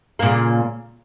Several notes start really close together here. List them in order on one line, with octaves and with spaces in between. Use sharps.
A#3 A#2 C#3